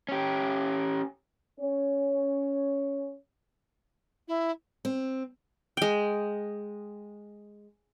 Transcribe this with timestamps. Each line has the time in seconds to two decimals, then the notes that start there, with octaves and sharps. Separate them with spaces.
0.09 C#4 G4
1.60 C#4 C#5
4.28 E4
4.85 C4
5.77 G#3 G5